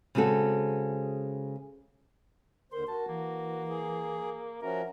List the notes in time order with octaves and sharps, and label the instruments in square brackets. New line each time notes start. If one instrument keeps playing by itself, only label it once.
[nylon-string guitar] C#3 G#3 C4 F#4 A4
[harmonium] D#2 D3 C5 [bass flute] A#4 [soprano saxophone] C6
[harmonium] F#4 [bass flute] A#4 [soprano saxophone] A5
[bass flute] E3 [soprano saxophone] A#3
[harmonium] G#4
[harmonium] F3 C#4 F#4 [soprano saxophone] A#4 [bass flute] E5